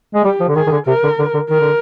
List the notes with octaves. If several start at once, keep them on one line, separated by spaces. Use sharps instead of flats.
G#3
G3 G4
F3
D3
D#3 G#4
D#3
D3
C3 A#4
D3
D3
D3
D#3 A#4
D3